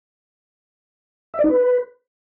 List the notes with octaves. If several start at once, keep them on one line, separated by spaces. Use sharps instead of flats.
E5
D5
D#4
B4